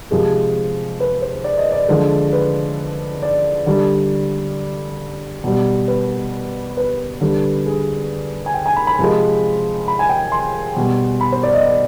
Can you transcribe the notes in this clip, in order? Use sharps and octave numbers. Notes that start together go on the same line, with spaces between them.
C3 F3 G#3 G#4
B4
C5
D5
D#5
D5
D3 F3 G#3
B4
D5
D3 G3
B2 G3
B4
B4
D3 G3
G#4
G#5
G5
G#5
B5
B5
C3 F3 G#3
B5
G#5
G5
C6
B2 G3
B5
C5
D5
D#5
D5